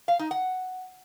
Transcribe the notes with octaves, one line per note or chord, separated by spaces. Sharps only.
F5
D#4
F#5